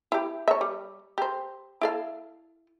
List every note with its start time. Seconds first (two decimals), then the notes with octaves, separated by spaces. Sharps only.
0.12 E4 G4
0.48 C#5 E5
0.61 G3
1.18 G4 C5
1.81 E4 A4 F5